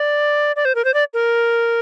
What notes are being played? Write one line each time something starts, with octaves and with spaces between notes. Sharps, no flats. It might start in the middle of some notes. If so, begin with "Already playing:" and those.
Already playing: D5
D5
C5
A#4
C5
D5
A#4